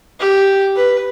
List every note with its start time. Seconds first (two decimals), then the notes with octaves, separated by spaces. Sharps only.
0.20 G4
0.76 B4